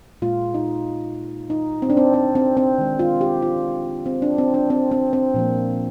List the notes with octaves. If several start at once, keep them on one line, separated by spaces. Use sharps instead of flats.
A#2 G#3 F4
D#4
D#4
C4
D4
C4
C4
C4
C4
D#3 G#3
F4
G4
F4
C4
D4
C4
D4
C4
C4
C4
A#2 F3 A#3